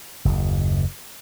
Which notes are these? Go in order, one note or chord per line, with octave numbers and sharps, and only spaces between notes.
F#1 D#2